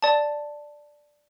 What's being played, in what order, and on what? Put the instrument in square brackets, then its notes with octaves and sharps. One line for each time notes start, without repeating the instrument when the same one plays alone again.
[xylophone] D5 A5